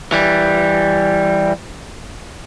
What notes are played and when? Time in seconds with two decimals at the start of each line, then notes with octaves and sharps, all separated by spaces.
0.12 E3 G3